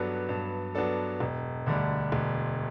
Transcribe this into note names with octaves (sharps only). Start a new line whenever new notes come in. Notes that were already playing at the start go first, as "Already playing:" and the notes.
Already playing: G2 F#3 B3 D4 A4
G2
F#3 B3 D4 A4
E1
D2 D3 G3
E1